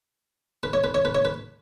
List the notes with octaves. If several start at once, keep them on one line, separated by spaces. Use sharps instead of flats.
B4
C#5
B4
C#5
B4
C#5
B4